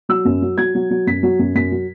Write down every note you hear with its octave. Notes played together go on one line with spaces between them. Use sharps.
F#3 E6
F#2
F#3
F#3 G#6
F#3
F#3
F#2 B6
F#3
F#2
F#2 B6
F#3